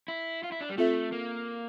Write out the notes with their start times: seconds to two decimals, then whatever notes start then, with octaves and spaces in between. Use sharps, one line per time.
0.08 E4
0.43 F4
0.52 E4
0.61 D4
0.69 G3
0.77 A3 C4 F4 A4 E5
1.12 A#3